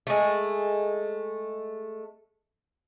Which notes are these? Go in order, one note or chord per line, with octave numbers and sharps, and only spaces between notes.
G#3 A3